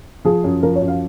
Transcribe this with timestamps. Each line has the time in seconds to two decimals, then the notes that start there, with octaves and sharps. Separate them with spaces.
0.25 F3 G#4
0.44 F#2
0.63 F3 A#4
0.75 C#5
0.82 F#2
0.88 F5